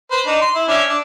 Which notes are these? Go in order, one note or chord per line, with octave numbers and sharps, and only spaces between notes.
B4 C5
D4 D#4
C6
E4
C#4 D4 E5
D4